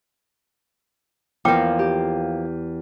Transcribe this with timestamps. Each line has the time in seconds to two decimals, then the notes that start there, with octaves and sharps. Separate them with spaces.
1.45 E2 F3 A#3 G5 D6
1.79 G4